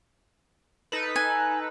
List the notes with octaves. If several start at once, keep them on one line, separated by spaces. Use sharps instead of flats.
D#4 A4 B4
G#5